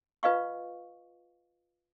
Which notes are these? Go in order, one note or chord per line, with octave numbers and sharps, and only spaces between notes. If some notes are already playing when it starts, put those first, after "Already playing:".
F4 B4 D#5 F5 C#6